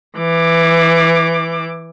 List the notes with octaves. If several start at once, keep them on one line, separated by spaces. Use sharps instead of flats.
E3 D6